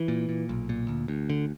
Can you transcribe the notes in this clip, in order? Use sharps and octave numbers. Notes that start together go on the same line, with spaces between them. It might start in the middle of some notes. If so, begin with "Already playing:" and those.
Already playing: E3
A#2
A#2
B1
A#2
D2
D2
D3